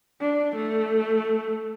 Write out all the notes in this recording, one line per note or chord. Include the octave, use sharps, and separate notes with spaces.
D4
A3